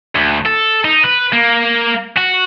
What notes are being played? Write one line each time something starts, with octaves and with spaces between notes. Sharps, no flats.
D2
A4
D#4
B4
A#3
F#4